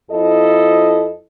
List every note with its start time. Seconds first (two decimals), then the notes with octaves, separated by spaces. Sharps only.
0.10 F2 E4 A4 D#5